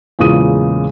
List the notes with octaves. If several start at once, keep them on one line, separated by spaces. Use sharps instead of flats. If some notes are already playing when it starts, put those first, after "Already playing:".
E2 A#2 C#3 G#3 D#6 D#7